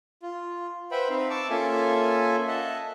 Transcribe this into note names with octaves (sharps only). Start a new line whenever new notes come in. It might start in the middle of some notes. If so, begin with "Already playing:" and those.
F4
B4 C5 E5 F#5 G5 B5
C4 D#4 F5
A5 C#6 D6 E6
A#3 C#4 F4 A4 E5 G#5
D#5 E5 F#5 A5